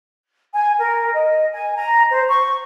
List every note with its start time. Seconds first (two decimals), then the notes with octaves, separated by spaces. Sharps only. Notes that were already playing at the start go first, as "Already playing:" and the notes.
0.54 G#5
0.78 A#4
1.13 D#5
1.53 G#5
1.75 A#5
2.10 C5
2.28 C#6